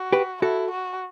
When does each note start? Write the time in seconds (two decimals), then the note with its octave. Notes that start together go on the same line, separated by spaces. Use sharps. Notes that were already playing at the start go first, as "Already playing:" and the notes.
Already playing: F#4
0.12 G4 B4
0.42 E4 F#4 A4
0.71 F#4